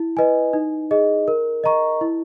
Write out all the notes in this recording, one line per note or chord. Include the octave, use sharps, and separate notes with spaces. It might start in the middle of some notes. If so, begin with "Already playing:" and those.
Already playing: E4
B4 D#5 G#5
D#4
G#4 D#5
A#4
D#5 A#5 C#6
E4